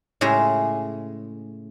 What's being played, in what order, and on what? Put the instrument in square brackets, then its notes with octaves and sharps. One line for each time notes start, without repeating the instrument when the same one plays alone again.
[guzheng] A2 C#3 G#3 G4 E5 A#5